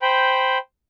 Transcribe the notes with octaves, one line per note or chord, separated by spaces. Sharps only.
C5 G5 B5